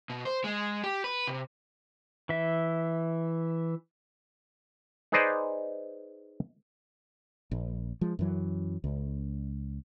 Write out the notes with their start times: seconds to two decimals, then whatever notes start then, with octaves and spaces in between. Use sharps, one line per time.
0.10 B2
0.25 C5
0.44 G#3
0.84 G4
1.04 B4
1.27 C3
2.29 E3 E5
5.12 D#4 G#4 B4 C5 D5 D#5
7.51 A#1
8.01 F3 G#3
8.19 F#2 E3 F#3
8.84 C#2